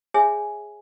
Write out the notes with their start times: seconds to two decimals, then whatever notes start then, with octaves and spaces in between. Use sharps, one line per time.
0.14 G#4 C#5 E5 G#5